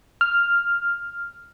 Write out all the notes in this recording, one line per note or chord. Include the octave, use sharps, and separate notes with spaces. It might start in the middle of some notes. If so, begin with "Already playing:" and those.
F6